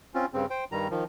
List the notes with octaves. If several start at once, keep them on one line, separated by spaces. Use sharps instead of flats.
C4 C#4 F4
G2 C#3 C4
C5 G5
G2 D#3 G3 A#5
D#3 F3